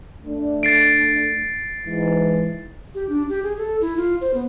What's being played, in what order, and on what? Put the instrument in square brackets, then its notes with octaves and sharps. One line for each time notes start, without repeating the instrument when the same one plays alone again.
[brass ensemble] A3 D4
[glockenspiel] A6 C7 D7
[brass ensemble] G#2 E3
[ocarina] G4
D4
G4
G#4
A4
E4
F4
C5
B3